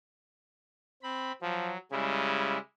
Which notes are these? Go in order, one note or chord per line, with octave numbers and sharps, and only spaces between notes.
C4 B5
F3 F#3
C#3 G3 G#3 E4